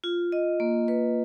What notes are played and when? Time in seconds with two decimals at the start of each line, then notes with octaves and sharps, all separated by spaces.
0.04 F4
0.32 D#5
0.60 A#3
0.88 B4